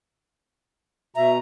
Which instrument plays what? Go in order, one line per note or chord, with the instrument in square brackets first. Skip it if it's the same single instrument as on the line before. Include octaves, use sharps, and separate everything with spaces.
[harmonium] B2 A#5 [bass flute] E5